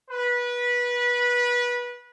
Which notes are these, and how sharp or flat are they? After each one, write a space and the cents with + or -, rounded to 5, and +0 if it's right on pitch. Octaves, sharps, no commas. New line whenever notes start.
B4 -20